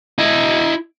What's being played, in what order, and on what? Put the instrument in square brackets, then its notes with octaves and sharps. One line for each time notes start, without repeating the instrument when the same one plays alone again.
[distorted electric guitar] E4 D#5